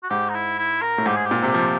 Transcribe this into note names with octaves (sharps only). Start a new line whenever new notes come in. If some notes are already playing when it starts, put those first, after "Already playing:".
F#4
G#2 G4
D#4
E4
E4
A#4
A2
G#2 G4
G#4
G4
A#2
C3
F3